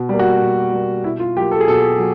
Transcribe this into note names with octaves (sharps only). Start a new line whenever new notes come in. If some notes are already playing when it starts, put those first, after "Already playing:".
Already playing: B2
G3 A#3
F#4
B2
G3 A#3
B2 E4
F4
F#3 A#3 G4
A4
G#4
B2 A4
F#3